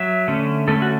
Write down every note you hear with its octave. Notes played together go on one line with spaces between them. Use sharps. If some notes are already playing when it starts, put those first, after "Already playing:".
Already playing: F#3 E5
D3 A3 C#4
D3 A3 C#4 A4
F#4